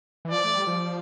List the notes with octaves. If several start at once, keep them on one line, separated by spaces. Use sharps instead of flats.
E3
F3 D5
A3
G3
F3